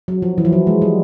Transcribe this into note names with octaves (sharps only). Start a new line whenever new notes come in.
F#3
F3
E3
F3
F#3
G#3
G3